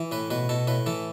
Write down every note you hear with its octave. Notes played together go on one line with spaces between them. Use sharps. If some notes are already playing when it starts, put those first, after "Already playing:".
Already playing: E3
A2 B4
B2 B4
B2 A4
A2 B4
E3 A4